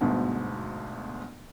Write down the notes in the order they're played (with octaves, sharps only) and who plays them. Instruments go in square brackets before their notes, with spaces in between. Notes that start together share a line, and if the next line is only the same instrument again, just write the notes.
[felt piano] G1 D2 G#2 B2